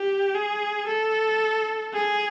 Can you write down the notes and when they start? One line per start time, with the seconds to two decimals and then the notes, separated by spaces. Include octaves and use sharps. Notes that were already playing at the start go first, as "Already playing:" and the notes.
Already playing: G4
0.35 G#4
0.88 A4
1.93 G#4